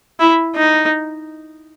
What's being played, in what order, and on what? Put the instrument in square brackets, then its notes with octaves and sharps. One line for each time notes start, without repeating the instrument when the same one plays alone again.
[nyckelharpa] E4
D#4